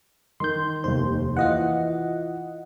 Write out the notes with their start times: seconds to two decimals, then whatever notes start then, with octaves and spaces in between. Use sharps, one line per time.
0.40 D#3 A#4 C6 G6
0.84 F1 D#2 C5
1.37 E3 F4 D#5 F#5